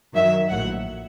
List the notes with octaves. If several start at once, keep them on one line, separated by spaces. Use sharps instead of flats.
F#2 D#3 F#3 E5
A#1 A2 F#3 F#5